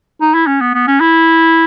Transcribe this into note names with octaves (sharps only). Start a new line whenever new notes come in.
D#4
E4
C#4
B3
B3
C#4
E4